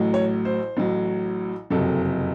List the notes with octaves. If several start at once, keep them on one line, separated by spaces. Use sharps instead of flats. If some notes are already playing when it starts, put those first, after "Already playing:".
Already playing: A1 A2 F#3
C#5
C5
A1 A2 F#3
F#1 F2 C3 F#3 A4